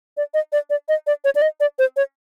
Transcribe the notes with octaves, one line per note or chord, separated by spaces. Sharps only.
D5
D#5
D5
D5
D#5
D5
C#5
D5
D#5
D5
C5
C#5